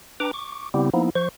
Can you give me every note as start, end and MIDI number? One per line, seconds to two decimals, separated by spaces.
0.20 0.31 62
0.20 0.31 71
0.20 0.31 79
0.20 0.31 82
0.20 0.31 86
0.33 0.69 85
0.33 0.69 86
0.74 0.90 49
0.74 0.90 55
0.74 0.90 59
0.74 0.90 60
0.74 0.90 64
0.74 0.90 67
0.93 1.10 53
0.93 1.10 58
0.93 1.10 59
0.93 1.10 63
0.93 1.10 64
1.15 1.29 53
1.15 1.29 72
1.15 1.29 85